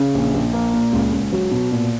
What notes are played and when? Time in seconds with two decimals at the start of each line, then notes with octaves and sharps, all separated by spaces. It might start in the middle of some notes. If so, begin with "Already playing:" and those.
Already playing: C#3
0.14 A#1
0.34 A#1
0.53 A#3
0.74 A#2
0.93 C#2
1.12 C#2
1.32 F#3
1.51 B2
1.71 A#2